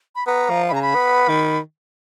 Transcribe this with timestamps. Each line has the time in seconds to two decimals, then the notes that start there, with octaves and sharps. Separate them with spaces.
0.15 B5
0.27 B3 A#5
0.50 F3
0.68 B5
0.72 C#3 A#5
0.82 B5
0.95 B3
1.28 D#3